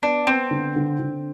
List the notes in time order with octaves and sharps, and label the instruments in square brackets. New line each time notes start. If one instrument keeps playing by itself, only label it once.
[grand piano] B3 [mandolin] D4
[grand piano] B3 [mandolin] C4
[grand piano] D3
D3
D3